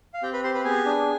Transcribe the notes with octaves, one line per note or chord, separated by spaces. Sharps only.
F5
C4 G4 G5
B4 B5
G4 C5 C6
B4 B5
B3 G#4 G#5
D4